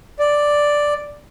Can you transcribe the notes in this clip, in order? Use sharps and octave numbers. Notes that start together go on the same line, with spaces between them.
D5